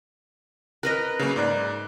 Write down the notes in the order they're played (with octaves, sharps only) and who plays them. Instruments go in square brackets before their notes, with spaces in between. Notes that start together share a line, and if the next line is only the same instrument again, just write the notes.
[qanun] A#4 B4 D#5 [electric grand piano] F#6
[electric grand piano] C#3 F#3 A#3
G#2 D5 F#6